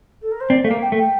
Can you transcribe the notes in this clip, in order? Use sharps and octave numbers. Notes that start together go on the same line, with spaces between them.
A4
A#4
C5
C4 D5
A3 F5
A#3
G5
A3
G5